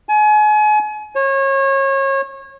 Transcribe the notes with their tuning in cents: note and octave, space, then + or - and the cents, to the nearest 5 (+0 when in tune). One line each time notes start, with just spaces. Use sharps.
G#5 +35
C#5 -30